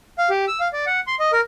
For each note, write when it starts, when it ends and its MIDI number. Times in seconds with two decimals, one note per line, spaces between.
0.18 0.29 77
0.30 0.45 67
0.48 0.60 88
0.60 0.68 77
0.73 0.85 74
0.86 1.00 78
1.07 1.15 84
1.19 1.31 75
1.33 1.41 70